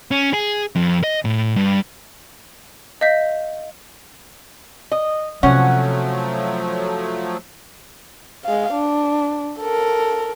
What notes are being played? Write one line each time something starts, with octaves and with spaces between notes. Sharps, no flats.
C#4
G#4
F2
D#5
A2
G2
D#5 F5 G6 B6
D#5
C3 F3 F#3 A3 C#4 F#5
G#3 F5
D4
A4 A#4